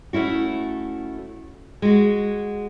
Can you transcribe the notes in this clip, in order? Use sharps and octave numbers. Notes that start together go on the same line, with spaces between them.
A3 C#4 E4 F#4
G#3 F#4